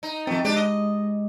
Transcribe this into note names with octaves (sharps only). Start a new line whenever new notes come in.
D#4
D#3 F3 A3 C4
G#3 D4 G4 D5
D#5